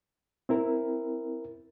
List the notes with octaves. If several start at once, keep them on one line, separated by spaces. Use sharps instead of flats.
C4 E4 A#4